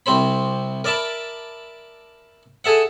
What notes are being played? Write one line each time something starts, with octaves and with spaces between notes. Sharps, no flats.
C2 C4 C5 B5
A#4 D5 E5 A5 B5
G#4 A4 E5 F#5